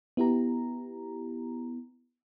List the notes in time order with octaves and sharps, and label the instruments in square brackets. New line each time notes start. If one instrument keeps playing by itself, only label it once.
[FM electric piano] B3 E4 G4 A#5